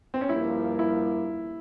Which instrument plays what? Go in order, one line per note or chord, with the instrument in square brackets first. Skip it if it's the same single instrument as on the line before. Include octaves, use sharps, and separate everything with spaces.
[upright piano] C4
C#4
[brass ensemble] G2 F3 A#3 [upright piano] E4
[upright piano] E4